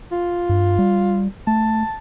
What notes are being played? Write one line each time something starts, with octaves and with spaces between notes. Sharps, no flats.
F4
G2
G3
A3 A5